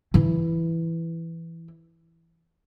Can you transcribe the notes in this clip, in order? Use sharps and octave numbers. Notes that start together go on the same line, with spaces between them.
E3 E4